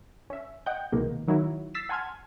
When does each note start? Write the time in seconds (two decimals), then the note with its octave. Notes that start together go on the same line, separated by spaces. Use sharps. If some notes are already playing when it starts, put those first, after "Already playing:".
0.30 C#4 E5
0.66 D#5 F#5 G5 G6
0.92 C2 B2 D#3 G#3 A#3
1.28 D#3 F#3 D#4 E4 F#4
1.74 E6 A6 B6 C7 E7
1.89 F#5 G#5 A5 C6 F6 G#6